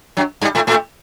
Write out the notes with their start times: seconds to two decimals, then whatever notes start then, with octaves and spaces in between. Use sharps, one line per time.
0.17 F#2 F#3
0.41 G2 G3
0.55 A2 A3
0.67 A2 A3